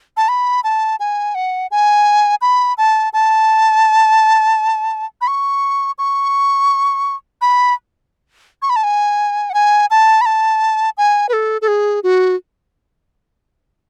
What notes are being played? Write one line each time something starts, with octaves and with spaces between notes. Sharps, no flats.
A5
B5
A5
G#5
F#5
G#5
B5
A5
A5
B5
C#6
C#6
B5
C#6
B5
A5
G#5
F#5
G#5
A5
B5
A5
G#5
B4
A4
A4
G#4
F#4